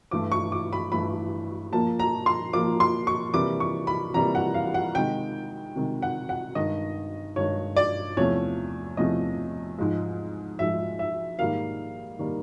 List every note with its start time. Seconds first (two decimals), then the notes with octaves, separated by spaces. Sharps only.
0.11 G2 E3 A3 D6
0.32 C#6
0.52 D6
0.73 B5
0.92 G2 E3 A3 B5
1.72 A#2 F3 A#3 A5
1.99 A#5
2.26 C6
2.53 A#2 F3 A#3 D6
2.80 C6
3.07 C#6
3.34 C3 E3 G3 A#3 D6
3.60 C#6
3.87 B5
4.14 C3 E3 G3 A#3 A#5
4.35 F#5
4.54 F5
4.74 F#5
4.95 C3 D#3 G#3 G5
5.76 C3 D#3 G#3
6.02 F#5
6.29 F#5
6.55 G2 D#3 G#3 D#5
7.36 G2 D#3 G#3 C#5
7.76 D5
8.17 E2 C3 F3 A3 C#5
8.97 E2 C3 F3 A3 D#5
9.78 G#2 F3 G#3
10.59 G#2 F3 G#3 E5
10.99 E5
11.39 G#2 D#3 G3 A#3 F5
12.19 D#3 G3 A#3